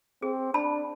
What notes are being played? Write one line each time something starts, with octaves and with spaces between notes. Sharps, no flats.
C4 G#4
D4 A5 B5